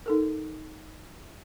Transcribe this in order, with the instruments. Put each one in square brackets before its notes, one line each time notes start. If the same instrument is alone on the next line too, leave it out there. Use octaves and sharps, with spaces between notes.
[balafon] D#4 A4 A#4